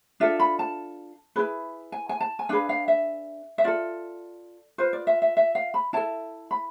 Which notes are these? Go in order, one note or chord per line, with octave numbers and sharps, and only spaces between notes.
D4 F4 A4 E5
B5
A5
E4 G#4 B4
G#5
G#5
A5
G#5
D4 G#4 B4 F5
F5
E5
E5
F4 A4 D5
F4 B4 C5
D5
E5
E5
E5
F5
B5
E4 A4 A5
B5